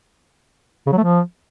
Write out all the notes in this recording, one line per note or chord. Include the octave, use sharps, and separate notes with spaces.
C#3
F#3
A3
F3